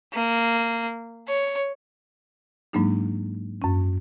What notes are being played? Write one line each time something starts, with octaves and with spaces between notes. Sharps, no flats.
A#3
C#5
G#2 F#3 G#3 A#3 D4 D#4
F#2 C#4